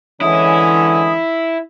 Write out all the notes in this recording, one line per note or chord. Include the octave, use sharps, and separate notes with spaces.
D3 E3 G#3 C#4 E4 D#6